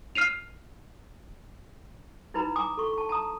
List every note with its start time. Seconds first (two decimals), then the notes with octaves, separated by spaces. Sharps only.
0.15 F6 C7 D#7 F7
2.34 D#4 E4 B4 A#5 B5
2.56 G#5 A#5 D6 D#6
2.77 A4 C#6
2.93 A5 C#6
3.09 A5 A#5 D#6